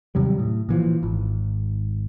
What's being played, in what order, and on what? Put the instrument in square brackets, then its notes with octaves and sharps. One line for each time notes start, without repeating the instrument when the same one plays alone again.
[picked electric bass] D#2 C3 F#3 G3
A2
A#2 E3 F3
G#1